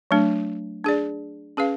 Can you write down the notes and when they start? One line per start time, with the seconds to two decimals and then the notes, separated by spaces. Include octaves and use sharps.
0.11 F#3 A3 D4
0.84 D4 G#4 D5
1.57 C#4 G#4 B4 F5